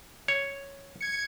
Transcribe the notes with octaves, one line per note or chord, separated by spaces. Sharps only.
C#5
G#6 C#7